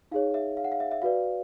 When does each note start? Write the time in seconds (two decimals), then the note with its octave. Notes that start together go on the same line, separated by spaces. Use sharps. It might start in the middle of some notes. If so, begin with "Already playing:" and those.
0.11 D#4 G#4 C#5 F5
0.34 E5
0.57 F5
0.64 F#5
0.72 F5
0.80 E5
0.91 E5
1.02 F#4 B4 D5 F5